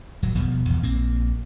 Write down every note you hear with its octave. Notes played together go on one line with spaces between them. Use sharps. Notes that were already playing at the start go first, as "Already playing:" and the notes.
D1 F#3
D#1 B2 F3 G3
G1 E2
A#1 A#3 C4